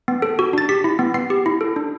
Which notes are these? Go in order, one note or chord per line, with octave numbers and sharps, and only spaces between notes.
B3
A4
F#4
D4 A6
G4 B6
E4
B3
B3 C7
G4
E4
A4
D4